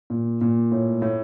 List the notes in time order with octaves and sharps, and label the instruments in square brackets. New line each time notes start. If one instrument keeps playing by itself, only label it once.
[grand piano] A#2
A#2
A2
A2